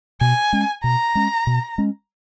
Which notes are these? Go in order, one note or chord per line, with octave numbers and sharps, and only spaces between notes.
B2 G#5
G#3 C#4
B2 A#5
G#3 C#4
B2
G#3 C#4